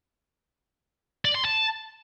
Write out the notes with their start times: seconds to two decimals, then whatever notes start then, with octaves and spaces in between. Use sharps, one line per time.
1.25 D5
1.35 C6
1.44 A5